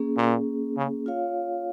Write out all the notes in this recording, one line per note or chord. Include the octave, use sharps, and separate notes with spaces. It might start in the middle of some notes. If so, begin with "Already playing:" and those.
Already playing: A#3 C#4 G#4
A#2
C#3
F4 C#5 F5